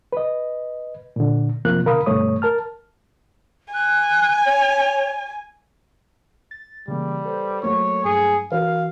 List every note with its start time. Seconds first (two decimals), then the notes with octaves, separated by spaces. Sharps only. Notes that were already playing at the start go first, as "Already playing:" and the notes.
0.13 B4 D#5
1.16 A#2 D3
1.65 F#2 C3 F3 A#3 F#6
1.85 B2 D3 A#4 F5 B5 D#6
2.06 D2 G2 B2 A3 C#5 D#6
2.42 A#4 A5 F6
3.74 G#5 F#6
4.45 C#5
6.51 A6
6.88 C#3 E3 G3 A#3
7.25 A4 B4 C5
7.62 F#3 A3 A#3 C#5
8.04 G2 G#4 C#7
8.52 E3 F#4 A#4 B4 F5